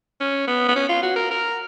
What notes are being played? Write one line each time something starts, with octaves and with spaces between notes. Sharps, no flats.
C#4
B3
B3
C#4
F4
F#4
A#4
A#4